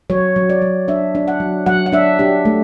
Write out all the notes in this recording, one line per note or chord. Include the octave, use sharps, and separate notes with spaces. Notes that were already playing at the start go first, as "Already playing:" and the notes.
F#3 C#5
F#3
D5
F#3
D4 E5
D4
F#5
F#3
F#3 F#5
F#5
D4 E5
D4 G4
A3